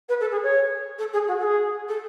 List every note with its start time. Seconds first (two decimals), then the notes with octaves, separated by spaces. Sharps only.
0.08 B4
0.20 A4
0.31 G#4
0.42 C#5
0.98 A4
1.13 G#4
1.27 F#4
1.39 A4
1.43 G#4
1.88 A4